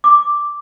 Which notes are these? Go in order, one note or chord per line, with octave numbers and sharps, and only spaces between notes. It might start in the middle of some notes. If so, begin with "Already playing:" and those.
D6